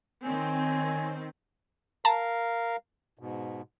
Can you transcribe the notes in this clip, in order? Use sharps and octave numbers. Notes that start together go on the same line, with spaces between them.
D#3 C4 C#5 G#5
A#4 F5 A5 A#5
G#2 B2